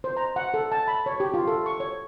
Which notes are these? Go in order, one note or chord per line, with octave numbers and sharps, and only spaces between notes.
C5
A#5
F#5
A4
A5
B5
C#5
G4
F4
A4
C#6
C#5